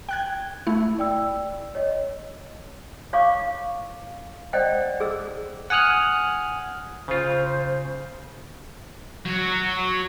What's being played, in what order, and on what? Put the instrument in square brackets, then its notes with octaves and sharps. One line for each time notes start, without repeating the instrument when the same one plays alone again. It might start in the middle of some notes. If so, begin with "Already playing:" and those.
[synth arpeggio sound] G5 F#6 G#6
A3 E4
[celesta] D5 G5 E6
C#5 D#5
[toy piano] C#5 F5 C#6 D6
C5 D5 D#5 F#5 G5
G#4 E6
[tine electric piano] F#5 G#5 D#6 F6 F#6
[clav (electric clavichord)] C#3 F4 [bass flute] C5
[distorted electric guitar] F#3 F#4